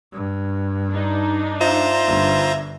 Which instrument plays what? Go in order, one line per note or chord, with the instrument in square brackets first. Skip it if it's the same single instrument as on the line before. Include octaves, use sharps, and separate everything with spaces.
[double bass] G2
[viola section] D4 D#4
[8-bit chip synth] F4 C5 A#5 [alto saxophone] E5
[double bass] G1 G2